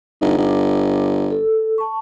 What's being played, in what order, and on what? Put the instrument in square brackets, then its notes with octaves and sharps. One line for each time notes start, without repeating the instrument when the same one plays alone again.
[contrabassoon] G1 [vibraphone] D#4
[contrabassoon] G1 [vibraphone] D6
[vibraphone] A4
A5 C#6